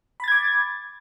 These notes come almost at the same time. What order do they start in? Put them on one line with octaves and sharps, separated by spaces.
B5 A6 G#6 D6